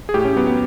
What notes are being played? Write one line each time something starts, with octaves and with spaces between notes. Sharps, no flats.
G#4
A2 G4
C#4
F#3 B3
B3